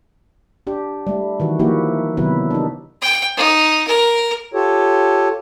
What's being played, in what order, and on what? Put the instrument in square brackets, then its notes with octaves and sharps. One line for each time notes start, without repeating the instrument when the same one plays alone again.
[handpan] D4 G4
G3 A3
D#3 E3 F#4
F3 A#3 D#4 E4 F#4 G4
C3 D#3 F#3 B3 E4 B4
D4 D#4
[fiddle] G5
D#4
A#4
[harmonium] F4 G4 A4 C#5